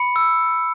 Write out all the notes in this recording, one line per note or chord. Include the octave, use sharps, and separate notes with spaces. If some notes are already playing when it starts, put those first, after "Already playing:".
Already playing: B5 C#7
E6